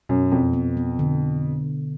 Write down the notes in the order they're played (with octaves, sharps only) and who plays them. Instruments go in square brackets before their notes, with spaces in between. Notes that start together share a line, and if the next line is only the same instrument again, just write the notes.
[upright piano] F#2 [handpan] B2
[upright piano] F2 [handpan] B2
[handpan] B3
B3
D3